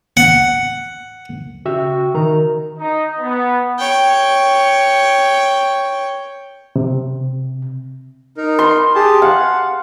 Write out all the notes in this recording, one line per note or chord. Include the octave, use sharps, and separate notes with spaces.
F#5
C#3 F#4 E5 G5
D#3 A#4 A#5
D#4
B3
C#5 G5
C3
D#4 A#4
C6
G4 G#4 A5
F5 F#5